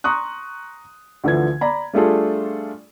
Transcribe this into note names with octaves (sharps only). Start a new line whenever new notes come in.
A#5 C6 C#6 D#6 F#6
D2 D3 E3 F3 G#6
D5 A#5 B5
G3 A3 D4 F4 G#4 A4